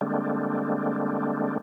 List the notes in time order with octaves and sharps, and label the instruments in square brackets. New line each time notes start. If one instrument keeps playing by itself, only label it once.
[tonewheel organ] D3 G3 G#3 A#3 C4 D4